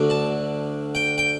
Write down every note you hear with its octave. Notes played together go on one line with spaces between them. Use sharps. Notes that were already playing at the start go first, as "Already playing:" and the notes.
Already playing: D2 D3 F#3
A5
G5
G5